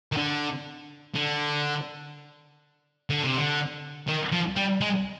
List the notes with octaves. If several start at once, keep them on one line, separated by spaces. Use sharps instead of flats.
D#3
D3
D3
D3
C3
D3
D#3
F3
G3
G#3